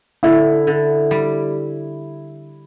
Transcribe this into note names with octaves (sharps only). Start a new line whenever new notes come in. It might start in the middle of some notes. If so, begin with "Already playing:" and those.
D3 E4
D3
G3